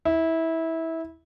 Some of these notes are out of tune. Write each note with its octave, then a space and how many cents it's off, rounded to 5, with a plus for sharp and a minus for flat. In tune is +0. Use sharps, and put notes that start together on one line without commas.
E4 -20